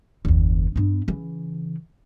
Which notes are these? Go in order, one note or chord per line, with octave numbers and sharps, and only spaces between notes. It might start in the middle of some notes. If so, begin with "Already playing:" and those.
F#1 D#2
G2 B3
C#3 E3